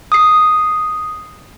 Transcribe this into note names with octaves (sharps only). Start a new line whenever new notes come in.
D#6 C7